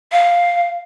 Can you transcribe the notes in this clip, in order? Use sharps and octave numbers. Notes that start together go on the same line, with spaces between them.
F5